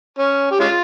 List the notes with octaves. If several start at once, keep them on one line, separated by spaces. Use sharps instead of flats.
C#4
G4
G#3 C#4 F4